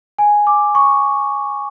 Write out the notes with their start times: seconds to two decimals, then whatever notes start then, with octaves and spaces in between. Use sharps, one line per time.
0.19 G#5
0.47 D6
0.75 C#6